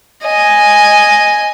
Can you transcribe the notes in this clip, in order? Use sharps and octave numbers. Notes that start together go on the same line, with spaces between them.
D#5 G#5